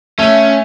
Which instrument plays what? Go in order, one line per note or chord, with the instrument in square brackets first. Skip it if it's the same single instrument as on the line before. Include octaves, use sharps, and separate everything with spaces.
[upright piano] A3 [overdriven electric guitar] C#4